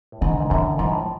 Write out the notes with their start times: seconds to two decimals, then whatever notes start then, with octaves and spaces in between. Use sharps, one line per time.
0.12 A2
0.21 G#2 B2 D3
0.40 G#2
0.50 F#2 A2 D3
0.78 G#2 F3
0.92 A2